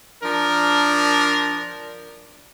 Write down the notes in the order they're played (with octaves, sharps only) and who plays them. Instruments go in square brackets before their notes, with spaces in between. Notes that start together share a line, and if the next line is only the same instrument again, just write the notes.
[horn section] F3 D4 A#4